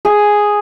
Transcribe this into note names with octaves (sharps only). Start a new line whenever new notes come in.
G#4